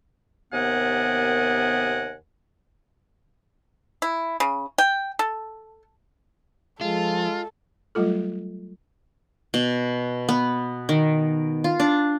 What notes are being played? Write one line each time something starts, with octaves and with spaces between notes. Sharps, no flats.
D#2 C3 B3 A#4 F#5 G#5
E4
C#3
G5
A4
F3 G#3 F4 A4
F#3 G3 A3 F4 A4
B2
B3
D#3
F4
D4